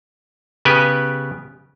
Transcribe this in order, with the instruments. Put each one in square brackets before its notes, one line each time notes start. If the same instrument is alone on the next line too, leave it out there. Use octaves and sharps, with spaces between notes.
[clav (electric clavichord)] C#3 B3 G4 B4 G#5